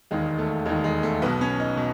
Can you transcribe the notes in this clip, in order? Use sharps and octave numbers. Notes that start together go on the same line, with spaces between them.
E1 D#2 D#3 G#3
A3
E1 D#2 D#3 G#3
G#3
A3
B1 B2 B3
C#4
D#4
B2